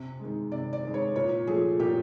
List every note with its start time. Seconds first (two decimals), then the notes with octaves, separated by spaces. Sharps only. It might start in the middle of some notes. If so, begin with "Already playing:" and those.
Already playing: C3
0.20 D#3 G#3
0.52 C3 D5
0.73 D5
0.84 D#3 G#3
0.94 C#5
1.16 A#2 C#5
1.47 F3 A3 G#4
1.79 A#2 G4